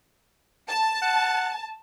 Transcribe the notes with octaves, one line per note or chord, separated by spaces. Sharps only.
A5
F#5